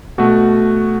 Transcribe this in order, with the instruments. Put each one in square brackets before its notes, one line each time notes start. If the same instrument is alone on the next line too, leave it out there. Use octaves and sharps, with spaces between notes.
[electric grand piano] B2 A3 F#4